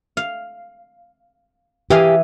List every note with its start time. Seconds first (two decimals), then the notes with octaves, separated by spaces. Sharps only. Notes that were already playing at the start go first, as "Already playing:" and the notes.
0.17 F5
1.90 E3 G4 G#4 F5